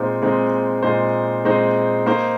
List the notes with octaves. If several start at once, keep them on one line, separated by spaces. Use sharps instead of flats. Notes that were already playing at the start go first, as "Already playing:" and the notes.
Already playing: A#2 G#3 C4 D#4 C5
A#2 G#3 C4 D#4 C5
A#2 G#3 C4 D#4 C5
A#2 G#3 C4 D#4 C5
A#3 D#4 C5